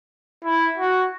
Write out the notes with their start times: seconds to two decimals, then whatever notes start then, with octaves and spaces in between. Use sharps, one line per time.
0.44 E4
0.78 F#4